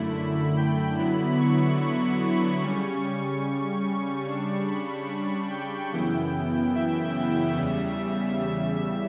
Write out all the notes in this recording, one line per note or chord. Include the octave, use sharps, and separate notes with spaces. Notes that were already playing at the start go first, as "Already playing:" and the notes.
Already playing: F#2 D3 A3 E4 B5
G5
D3 F#3 B3 E4 B5
C#6
C#6
C#3 G3 C#4
C#3 G3 D4 C#6
B5
G5
F#2 C#3 E3 B3 E4
E5
E2 C#3 G3
E5